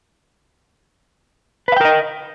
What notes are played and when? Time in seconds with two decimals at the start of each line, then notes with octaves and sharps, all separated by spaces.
1.68 B4
1.72 F5
1.77 G5
1.81 A#4
1.85 D#5